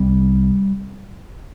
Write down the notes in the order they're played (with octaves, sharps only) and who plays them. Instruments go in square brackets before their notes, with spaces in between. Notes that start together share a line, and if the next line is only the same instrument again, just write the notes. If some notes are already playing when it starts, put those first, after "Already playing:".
Already playing: [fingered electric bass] C2 C3 G3